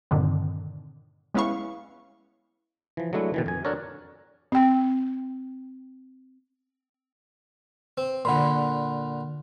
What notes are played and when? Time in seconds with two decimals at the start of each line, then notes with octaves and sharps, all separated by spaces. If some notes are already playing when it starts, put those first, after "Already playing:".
0.11 G2 A#2 D3 D#3 C4
1.34 G#3 B3 C#4 E4 F5 C#6
2.97 E3 F3
3.13 F#3 G#3 A3 D4 E4
3.34 B2 D#3 E3
3.46 F2 G#5
3.65 D4 F#4 A4 A#4 C#5
4.52 C4 G5
7.97 C4
8.25 A#2 D3 F#5 B5 C6